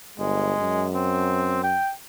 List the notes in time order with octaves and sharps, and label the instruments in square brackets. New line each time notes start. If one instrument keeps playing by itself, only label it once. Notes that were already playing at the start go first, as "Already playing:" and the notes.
[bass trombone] G1 [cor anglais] G#3
[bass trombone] F#2
[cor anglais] C4
G5